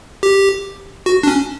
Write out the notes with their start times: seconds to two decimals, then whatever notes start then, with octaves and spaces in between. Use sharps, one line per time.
0.23 G4
1.06 F#4
1.23 D4
1.28 C#4